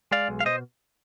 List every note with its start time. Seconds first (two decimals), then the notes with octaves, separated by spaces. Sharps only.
0.12 G#3 D5 F5
0.29 B1
0.40 F5
0.45 B2 C5 D#5